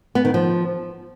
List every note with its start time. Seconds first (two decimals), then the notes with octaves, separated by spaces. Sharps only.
0.15 B3
0.25 D#3
0.34 F3